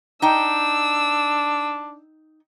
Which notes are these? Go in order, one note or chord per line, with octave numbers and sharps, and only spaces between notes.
D4 D#4 G5 E6